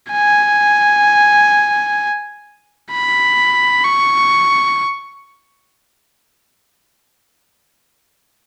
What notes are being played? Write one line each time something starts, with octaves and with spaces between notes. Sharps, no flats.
G#5
B5
C#6